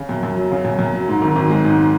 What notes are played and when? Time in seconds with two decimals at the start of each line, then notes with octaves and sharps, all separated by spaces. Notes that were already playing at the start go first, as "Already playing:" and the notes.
Already playing: C#3
0.09 F#2
0.23 F#2
0.37 F#3
0.51 C#3
0.64 F#2
0.79 F#2
0.93 F#3
1.08 G#2
1.22 G#1
1.36 G#1
1.49 G#3
1.64 G#2